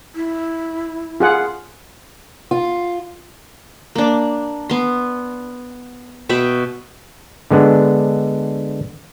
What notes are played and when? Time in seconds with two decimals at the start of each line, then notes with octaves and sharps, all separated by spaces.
0.15 E4
1.20 F4 G#4 F#5
2.51 F4
3.95 A#3 D4
4.69 B3 C6
6.29 B2 E5 G5 B5
7.50 D3 G#3 B3 D4